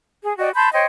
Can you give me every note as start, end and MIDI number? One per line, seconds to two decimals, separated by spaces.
0.23 0.34 68
0.39 0.50 66
0.39 0.50 74
0.39 0.50 75
0.39 0.50 79
0.55 0.69 81
0.55 0.69 83
0.55 0.69 84
0.55 0.69 91
0.73 0.86 72
0.73 0.86 73
0.73 0.86 75
0.73 0.86 79